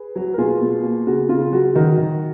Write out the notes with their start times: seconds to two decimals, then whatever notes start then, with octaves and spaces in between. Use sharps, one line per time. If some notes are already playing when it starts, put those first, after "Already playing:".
Already playing: G#4 B4
0.16 F#3
0.34 A#4
0.38 B2 F4 G#4
0.62 B2
0.83 A#3
1.07 C#3 F#4
1.29 C#3 F4
1.52 F#3 F#4
1.75 D#3 F#4 A#4
1.98 D#3